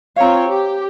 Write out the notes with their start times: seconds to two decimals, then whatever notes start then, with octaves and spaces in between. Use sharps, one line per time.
0.16 C4 F4 C#5 F5 A#5
0.48 G4